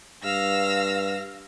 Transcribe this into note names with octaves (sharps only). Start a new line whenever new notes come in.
G2 F5 E6 A#6